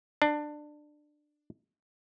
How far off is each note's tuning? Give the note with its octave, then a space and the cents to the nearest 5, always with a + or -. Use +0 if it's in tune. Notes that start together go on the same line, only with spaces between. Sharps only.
D4 +20